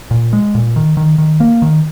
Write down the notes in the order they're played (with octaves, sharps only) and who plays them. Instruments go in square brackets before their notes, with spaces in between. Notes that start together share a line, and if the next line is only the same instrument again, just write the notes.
[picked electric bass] A#2
G#3
A#2
D#3
D#3
D#3
A#3
D#3